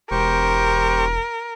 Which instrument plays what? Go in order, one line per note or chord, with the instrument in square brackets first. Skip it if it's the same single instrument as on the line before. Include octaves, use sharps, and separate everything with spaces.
[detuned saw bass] E1 [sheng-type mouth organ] G4 C5 C#6 [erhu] A#4